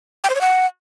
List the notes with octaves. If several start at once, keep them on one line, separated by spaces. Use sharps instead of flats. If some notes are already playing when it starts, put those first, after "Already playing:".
G5
C5
C#5
F#5